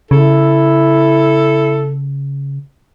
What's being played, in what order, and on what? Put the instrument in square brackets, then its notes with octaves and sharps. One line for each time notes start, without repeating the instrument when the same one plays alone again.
[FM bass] C#3 [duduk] E4 [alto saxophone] A4